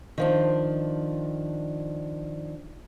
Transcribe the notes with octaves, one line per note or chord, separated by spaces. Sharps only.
D#3 F3 D4